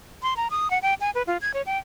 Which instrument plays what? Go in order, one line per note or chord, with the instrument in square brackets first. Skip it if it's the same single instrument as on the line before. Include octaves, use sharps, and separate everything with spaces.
[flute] C6
A#5
D#6
F#5
G5
G#5
B4
F4
G#6
C#5
G5